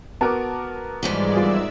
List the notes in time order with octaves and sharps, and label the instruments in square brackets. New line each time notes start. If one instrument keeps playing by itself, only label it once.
[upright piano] B3 F#4 A#4 [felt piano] A5 D6
[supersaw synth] G#2 G#3 D5 [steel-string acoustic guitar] E3 F3 G3
[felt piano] G#3 F4 [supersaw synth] E5 E6